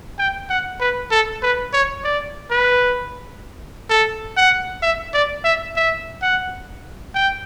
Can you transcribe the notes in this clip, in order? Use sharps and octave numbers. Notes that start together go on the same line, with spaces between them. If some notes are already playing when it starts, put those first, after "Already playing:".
G5
F#5
B4
A4
B4
C#5
D5
B4
A4
F#5
E5
D5
E5
E5
F#5
G5